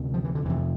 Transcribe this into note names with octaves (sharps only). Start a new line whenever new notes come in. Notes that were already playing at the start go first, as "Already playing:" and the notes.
Already playing: D2 C3
F3
E3
D3
F2 C3 E3